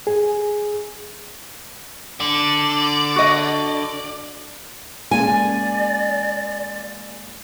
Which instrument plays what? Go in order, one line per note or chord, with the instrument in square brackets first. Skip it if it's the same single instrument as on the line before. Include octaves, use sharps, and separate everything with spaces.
[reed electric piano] G#4
[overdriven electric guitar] D3 [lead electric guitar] D5
[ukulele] F#4 D#5
[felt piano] G#3 A#3 C#4 [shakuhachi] D5 [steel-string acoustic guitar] G#5